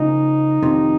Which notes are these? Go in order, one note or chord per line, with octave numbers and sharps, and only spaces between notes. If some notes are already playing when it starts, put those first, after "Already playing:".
Already playing: C#3 F3 A#3 D#4
F2 C3 D#3